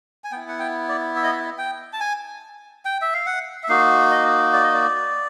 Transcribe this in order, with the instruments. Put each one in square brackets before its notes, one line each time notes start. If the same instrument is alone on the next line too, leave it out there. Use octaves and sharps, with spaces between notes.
[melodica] G#5
B3 E4 G5
F#5
G5
D5
E5
D#5
E5
G5
A5
G#5
G5
E5
F5
F#5
E5
A#3 D#4 F#4 F5
D#5
D5
D#5
D5